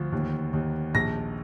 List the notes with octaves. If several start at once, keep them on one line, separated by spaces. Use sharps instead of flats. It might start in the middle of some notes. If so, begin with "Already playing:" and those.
Already playing: D2 F3
D#2
D#2
A#1 A#6